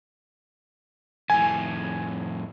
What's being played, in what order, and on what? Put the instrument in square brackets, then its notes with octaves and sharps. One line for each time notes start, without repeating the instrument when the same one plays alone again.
[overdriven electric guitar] F2 A2 [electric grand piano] G#5